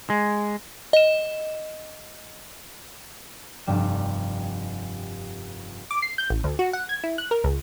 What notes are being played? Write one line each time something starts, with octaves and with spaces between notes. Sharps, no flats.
G#3
D#5 E7
F1 G2 G3 E7
D6
C7
G6
A1
D2
F#4
F#5
G#6
E4
F#6
A#4
C#2